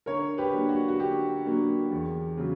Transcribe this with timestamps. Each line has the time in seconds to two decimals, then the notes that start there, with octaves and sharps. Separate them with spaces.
0.06 D3 A#4 C#5
0.38 G4 B4
0.53 F#3 A#3 D4
0.69 F#4
0.88 F#4
0.99 D3 G4
1.45 F#3 A#3 D4
1.92 E2
2.38 C#3 F#3